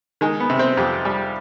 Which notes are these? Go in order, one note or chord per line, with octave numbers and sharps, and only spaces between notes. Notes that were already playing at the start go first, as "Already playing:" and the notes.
D#3 G#3
B3
C3
C4
F2 G4
G3